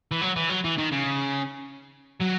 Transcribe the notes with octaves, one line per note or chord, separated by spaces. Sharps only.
E3
F#3
E3
F#3
E3
D#3
C#3
F#3